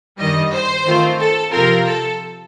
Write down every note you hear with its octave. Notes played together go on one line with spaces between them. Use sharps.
G2 D#3 G3 D#5
C5
D#3 A3 C4 F4
A4
C3 F3 C4 F4 A#4
A4